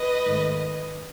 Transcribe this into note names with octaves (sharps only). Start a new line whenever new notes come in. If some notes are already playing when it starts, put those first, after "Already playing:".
Already playing: B4 D#5
G#2 D#3 A3